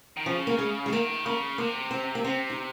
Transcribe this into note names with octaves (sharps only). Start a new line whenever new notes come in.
D#3
C#3 F3
A#3
G#3
G#3
D#3 A#3
C#3 A#3
C3 A#3
C4
A#3
C3 C4
D#4